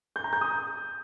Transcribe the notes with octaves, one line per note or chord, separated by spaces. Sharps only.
G6
A#5
G6
D#6